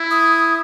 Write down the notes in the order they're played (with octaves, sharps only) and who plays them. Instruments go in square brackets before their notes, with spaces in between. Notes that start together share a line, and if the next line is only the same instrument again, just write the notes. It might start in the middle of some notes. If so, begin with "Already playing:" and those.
Already playing: [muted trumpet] E4
[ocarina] D#6